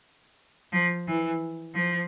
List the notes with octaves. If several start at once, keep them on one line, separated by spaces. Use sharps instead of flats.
F3
E3
F3